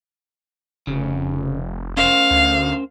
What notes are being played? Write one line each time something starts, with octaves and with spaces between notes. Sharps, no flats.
F1 C#3
C#4 A#4 C5 F5
D2